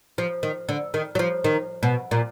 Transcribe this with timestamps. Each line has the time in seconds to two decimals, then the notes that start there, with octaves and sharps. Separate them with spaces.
0.18 F3
0.43 D#3
0.69 D3
0.94 D#3
1.15 F#3
1.19 F3
1.44 D#3
1.83 B2
2.11 A#2